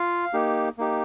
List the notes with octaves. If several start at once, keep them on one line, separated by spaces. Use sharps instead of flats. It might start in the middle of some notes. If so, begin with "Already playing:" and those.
Already playing: F4 F5
A#3 D#4 G4
A#3 D#4 G4